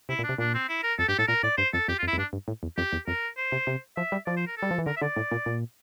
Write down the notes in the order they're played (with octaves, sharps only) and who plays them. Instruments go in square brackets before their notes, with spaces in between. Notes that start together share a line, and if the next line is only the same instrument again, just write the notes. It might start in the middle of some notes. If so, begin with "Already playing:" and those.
[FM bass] C3 [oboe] E4
[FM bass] A#2
[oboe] D4
[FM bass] C3
[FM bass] A#2 [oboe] D4
[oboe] C4
E4
A#4
[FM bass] F2 [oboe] A4
[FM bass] G2 [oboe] G4
[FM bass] A2 [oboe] A4
[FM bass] A#2 [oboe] A#4
[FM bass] A2 [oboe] D5
[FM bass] G2 [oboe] C5
[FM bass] F2 [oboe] A4
[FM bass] F2 [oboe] G4
[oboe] F4
[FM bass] F2
[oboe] E4
[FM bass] F2
[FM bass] G2 [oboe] D4
[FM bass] G2
A2
E2
[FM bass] F2 [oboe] G4
[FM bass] E2
[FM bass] F2 [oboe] A#4
[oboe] C5
[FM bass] C3
C3
[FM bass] F3 [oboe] E5
[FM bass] G3
[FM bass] F3 [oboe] D5
[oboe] C5
A#4
A4
[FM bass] G3
F3
E3
[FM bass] D3 [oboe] A#4
[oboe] E5
[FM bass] D3 [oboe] D5
[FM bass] A2
A#2
A#2